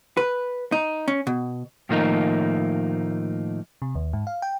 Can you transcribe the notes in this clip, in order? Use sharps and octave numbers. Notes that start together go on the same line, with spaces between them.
B4
D#4
C#4
B2
A2 D#3 F3 A3 A#3 D#4
C3
D#2
G#2
F5
G5